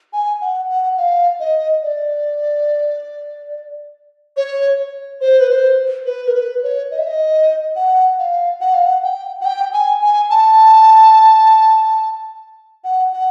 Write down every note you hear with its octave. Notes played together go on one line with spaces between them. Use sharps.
G#5
F#5
F#5
F5
D#5
D5
C#5
C5
B4
C5
B4
A#4
B4
C#5
D#5
E5
D#5
F#5
F5
F#5
F5
F#5
G5
F#5
G5
G#5
G#5
A5
F#5
F#5